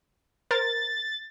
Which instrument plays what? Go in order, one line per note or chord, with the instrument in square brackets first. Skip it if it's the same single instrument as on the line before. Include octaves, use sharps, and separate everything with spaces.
[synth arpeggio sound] A#4 C5 [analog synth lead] A6